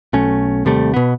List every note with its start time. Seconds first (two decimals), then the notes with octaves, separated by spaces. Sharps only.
0.13 B1 A3 C#4
0.65 D#2 C3 G3 A3
0.94 B2 B3